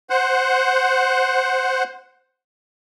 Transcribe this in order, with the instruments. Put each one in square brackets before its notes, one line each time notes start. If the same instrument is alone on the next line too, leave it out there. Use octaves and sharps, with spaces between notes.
[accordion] C5 F#5